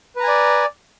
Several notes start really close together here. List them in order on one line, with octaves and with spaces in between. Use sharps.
B4 A#5 G#5 D5